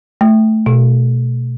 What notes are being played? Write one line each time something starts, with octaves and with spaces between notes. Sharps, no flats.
A3
B2